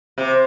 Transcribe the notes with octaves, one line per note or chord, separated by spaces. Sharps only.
C3